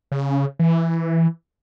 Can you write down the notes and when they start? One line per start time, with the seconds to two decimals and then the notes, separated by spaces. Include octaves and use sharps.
0.12 C#3
0.59 E3